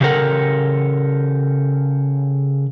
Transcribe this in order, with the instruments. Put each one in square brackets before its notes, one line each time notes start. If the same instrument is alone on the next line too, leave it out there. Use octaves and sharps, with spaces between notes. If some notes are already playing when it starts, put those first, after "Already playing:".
[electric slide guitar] C#3 F#3 G4 A4 A#4 F#5